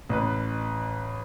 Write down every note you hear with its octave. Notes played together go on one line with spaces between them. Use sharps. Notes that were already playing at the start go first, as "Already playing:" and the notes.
A1 B4